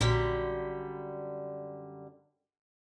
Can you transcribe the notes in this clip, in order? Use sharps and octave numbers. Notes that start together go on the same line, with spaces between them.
A#1 F#2 D3 G3 B6